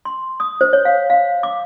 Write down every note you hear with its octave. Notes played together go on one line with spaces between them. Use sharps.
C6
D#6
C5
C#5
F5
F5
D6